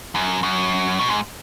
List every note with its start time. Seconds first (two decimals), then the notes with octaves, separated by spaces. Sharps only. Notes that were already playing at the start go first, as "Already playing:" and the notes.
0.15 F#2
0.43 F#2
0.99 B2
1.09 G#2